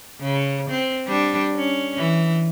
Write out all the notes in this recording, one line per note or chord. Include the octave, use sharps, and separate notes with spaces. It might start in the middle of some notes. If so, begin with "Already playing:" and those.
C#3
C4
G3 D4
C#4
E3